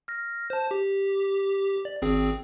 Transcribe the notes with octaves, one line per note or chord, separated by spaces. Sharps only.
F6 A#6
C5 A5
G4
D5
G#1 C4 G#4